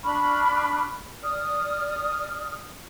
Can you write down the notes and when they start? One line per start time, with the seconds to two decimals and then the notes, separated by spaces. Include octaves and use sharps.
0.04 D4 B5 C#6 F6
1.23 D5 D#6 F6